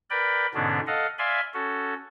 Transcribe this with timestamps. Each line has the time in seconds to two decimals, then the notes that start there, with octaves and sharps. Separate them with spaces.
0.10 A#4 B4 D5 G5 B5
0.54 G#2 B2 D3 B3 C#4 D4
0.87 A4 D#5 F5 F#5
1.18 D5 E5 F5 G#5 B5 C6
1.54 C#4 F#4 A4